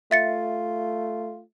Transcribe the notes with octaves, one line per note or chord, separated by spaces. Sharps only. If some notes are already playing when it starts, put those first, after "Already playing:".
A3 F4 E5 A6 C#7